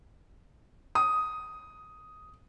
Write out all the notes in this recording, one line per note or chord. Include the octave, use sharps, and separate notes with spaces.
D#6